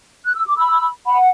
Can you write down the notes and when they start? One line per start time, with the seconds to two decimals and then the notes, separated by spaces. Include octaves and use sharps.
0.25 F#6
0.35 E6
0.46 D6
0.57 B5 E6
1.06 F#5 B5